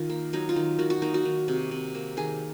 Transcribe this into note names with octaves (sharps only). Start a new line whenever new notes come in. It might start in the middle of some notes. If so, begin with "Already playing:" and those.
Already playing: D#3 F4
A#3
F#3 D#4
F4
D#3
D#3 F#4
F#4
A#3 D#4
F#4
D#3
C3
C3
A#3
D#3 G#4